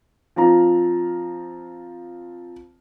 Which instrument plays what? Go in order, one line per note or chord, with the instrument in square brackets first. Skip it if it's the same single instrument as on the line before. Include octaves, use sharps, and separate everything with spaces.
[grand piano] F3 C4 F4 A#5